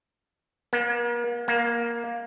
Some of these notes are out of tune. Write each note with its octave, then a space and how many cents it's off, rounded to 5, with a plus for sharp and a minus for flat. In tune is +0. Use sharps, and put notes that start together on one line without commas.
A#3 +40
A#3 +10